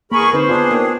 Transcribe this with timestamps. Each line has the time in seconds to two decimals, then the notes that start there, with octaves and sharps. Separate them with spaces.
0.12 E2 A#3 G#4 A#4 B5 C#6
0.33 D3 C4 D#4 B4 C5
0.49 B3 D4 F4 G#4
0.71 A#3 D#4 G4